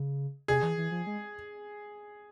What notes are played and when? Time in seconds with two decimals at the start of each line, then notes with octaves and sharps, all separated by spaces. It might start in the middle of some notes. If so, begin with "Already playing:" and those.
Already playing: C#3
0.48 C3 G#4
0.62 E3
0.77 E3
0.91 F3
1.07 G#3